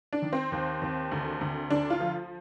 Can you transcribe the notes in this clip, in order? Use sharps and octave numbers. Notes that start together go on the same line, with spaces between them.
D4
D#3
C4
D#2
D#2
D2
D2
D2 D4
F4
F3